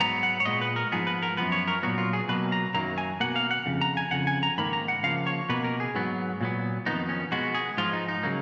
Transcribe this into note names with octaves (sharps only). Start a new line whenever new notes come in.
G#2 F#3 B3 A#5
F#5
C#5
A#2 G#3 B3 D#5
B4
A#4
G#2 F3 B3 G#4
B4
A#4
F#2 F3 B3 B4
C#5
A#4
A#2 F#3 B3 F#4
F4
G#4
B2 F#3 A#3 B4
A#5
F#2 D#3 F#3 A#3 A#5
G#5
B2 A#3 F#5
F5
F#5
F2 C#3
A#5
G#5
F2 C#3 F#5
G#5
A#5
G#2 D#3 A#3 B5
A#5
F#5
C#3 F3 A#3 F5
C#5
B2 A#3 B4
A#4
G#4
G#2 F#3 B3
A#2 F#3 B3
F2 D#3 G#3 B3 D#4
C#4
B2 G#3 B3 F#4
G#4
G#2 F3 G#3 F4
D#4
D#4
C#3 F#3 A#3